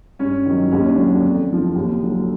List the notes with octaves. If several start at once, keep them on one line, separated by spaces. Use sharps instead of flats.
G2 C#4
D#3 F#3
D#2 C#4
D4
D3 F#3
F2
D3 F3
D#2
D3 F#3